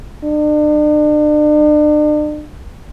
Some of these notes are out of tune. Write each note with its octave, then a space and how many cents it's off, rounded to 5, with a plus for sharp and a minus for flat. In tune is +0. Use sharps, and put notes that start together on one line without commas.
D4 +40